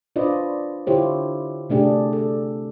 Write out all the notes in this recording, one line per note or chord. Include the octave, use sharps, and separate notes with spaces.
D4 F4 B4 C5 D5 D#5
D3 E4 F4 G4 C5 C#5
C3 A3 D4 G4 G#4
A4